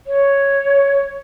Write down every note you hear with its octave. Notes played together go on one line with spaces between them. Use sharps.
C#5